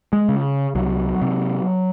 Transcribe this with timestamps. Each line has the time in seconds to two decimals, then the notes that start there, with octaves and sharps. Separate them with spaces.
0.13 G#3
0.29 C#3
0.75 C2 F#3
1.22 C3